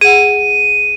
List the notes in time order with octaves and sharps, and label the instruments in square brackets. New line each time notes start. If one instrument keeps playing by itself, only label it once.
[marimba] G#4 F#5 [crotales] D#7